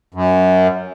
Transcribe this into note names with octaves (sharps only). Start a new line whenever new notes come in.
F#2